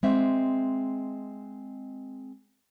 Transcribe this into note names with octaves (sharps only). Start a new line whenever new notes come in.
G#3 C4 E5